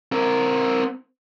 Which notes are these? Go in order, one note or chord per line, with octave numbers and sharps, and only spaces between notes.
C4 A#4